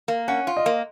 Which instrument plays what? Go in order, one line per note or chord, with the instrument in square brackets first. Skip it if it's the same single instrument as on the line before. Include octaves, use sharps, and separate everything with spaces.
[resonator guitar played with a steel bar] A#3
[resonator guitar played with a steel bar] C#4 [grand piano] F#5
[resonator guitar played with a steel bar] F4
[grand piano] D#5
[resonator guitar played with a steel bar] A#3